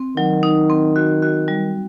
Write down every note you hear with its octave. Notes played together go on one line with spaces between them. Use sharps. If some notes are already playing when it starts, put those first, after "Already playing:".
Already playing: C4
D#3 F#3
D#4
C4
F#4
F#4
G3